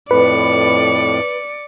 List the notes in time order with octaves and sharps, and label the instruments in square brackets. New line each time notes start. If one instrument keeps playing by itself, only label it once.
[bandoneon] F2 A2 [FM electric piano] B4 [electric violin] D5 C#7